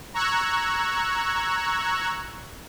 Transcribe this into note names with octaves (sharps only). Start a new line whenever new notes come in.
A#5 C#6 E6 F#6 G#6